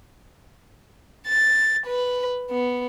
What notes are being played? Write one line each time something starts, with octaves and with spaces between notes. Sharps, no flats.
A6
B4
B3